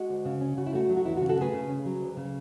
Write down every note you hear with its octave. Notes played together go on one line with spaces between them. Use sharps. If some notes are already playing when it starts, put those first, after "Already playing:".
Already playing: G#3 F#4
D2
C#3
C#4
C#3 F#4
E4
A3 F#4
F#3
F#4
E2 E4
F#4
C#3
F#4 A4
A3 G#4 B4
C#3
C#4
F#3
D2
C#3